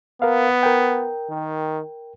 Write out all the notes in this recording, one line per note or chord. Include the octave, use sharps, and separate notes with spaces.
B3 A#4 F5
A#4 G5
D#3